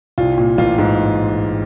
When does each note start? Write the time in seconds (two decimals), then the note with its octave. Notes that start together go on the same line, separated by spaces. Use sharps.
0.18 C2 F4
0.38 A#2
0.58 A1 F4
0.78 G#2